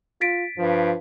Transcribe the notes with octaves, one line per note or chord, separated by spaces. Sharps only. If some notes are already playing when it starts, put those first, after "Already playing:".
F4 A6 B6 D7
G2 F3